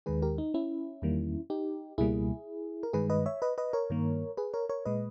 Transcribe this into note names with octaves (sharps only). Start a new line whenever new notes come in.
D#2 D#3 G#3 G#4 B4
G4 A#4
D#4
C#4 E4
E2 D#3 G3 A#3
D#4 G4
C#2 B2 G3 A#3 E4 G#4
A#4
G2 D#3 G#3 G#4 B4
B4 D#5
C#5 E5
B4 D#5
B4 D#5
A#4 C#5
G2 D#3 A#3
G#4 B4
A#4 C#5
A#4 C#5
A#2 G#3 B4 D#5